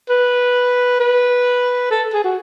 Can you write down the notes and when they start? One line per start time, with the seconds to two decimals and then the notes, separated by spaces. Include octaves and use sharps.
0.09 B4
1.00 B4
1.91 A4
2.13 G#4
2.24 F#4